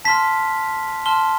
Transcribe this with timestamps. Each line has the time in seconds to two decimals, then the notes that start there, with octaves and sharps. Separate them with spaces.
0.05 A5 C6 F6 B6
1.06 A5 C6 F6 G7